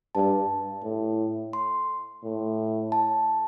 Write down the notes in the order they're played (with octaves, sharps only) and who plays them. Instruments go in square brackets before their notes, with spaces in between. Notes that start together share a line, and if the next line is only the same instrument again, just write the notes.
[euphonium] G2 [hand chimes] A5
[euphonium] A2
[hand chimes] C6
[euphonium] A2
[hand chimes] A5